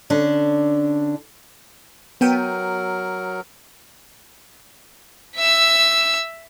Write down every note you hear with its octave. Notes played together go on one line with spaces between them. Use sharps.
D3 C#4 D4
F#3 B3 A#4 G5 D#7
E5 E6